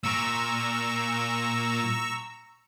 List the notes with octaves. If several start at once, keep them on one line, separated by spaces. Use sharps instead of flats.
A#2 A#5 C#6 E6